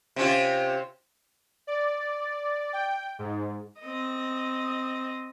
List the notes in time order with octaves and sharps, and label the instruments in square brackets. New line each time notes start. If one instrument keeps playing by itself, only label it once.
[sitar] C3 C#4 F4
[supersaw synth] D5
G5
G#2
[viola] C4 D#5